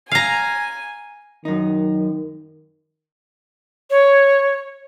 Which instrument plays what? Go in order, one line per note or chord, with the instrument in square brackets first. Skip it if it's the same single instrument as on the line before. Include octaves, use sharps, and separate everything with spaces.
[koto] F5 A#5 [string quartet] G#5
[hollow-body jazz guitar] F#2 D#4 [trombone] D#3
[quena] C#5